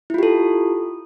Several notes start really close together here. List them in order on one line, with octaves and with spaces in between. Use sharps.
E4 F4 G4 A4